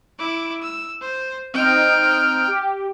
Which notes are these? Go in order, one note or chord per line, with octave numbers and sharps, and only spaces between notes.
E4 D6
E6
C5
C4 D#4 G5 F6
G4